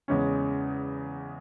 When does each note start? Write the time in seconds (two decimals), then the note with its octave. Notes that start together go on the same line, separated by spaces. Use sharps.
0.08 E2 C#3 G#3 C#4